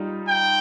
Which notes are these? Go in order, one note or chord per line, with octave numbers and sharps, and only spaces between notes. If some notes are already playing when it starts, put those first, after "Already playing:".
Already playing: G3 D#4 F4
G5